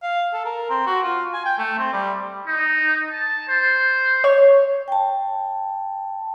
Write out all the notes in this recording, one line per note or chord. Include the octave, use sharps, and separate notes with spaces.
F5
A4
A#4
C4
F#4
F4
G#5
G5
A3
C4
G3
D#4
A5
C5
C#5
G5 A5